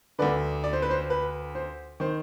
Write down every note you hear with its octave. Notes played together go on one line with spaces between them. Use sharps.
D2 D3 B4 D5
D5
C5
B4
C5
B4
C5
D#3 C5